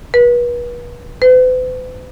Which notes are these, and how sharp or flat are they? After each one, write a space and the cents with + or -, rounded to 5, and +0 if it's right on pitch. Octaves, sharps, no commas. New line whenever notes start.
B4 -35
B4 +45